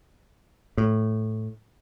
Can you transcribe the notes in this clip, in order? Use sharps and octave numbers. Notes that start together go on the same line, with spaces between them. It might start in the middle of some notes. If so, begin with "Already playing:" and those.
A2